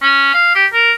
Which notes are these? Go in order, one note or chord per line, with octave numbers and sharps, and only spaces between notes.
C#4
F5
G4
A#4